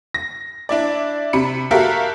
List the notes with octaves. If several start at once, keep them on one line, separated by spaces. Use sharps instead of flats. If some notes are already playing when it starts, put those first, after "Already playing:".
A#6
D4 E4 D5
C3 B5 C#7
F#4 G4 A4 A#4 E5 F5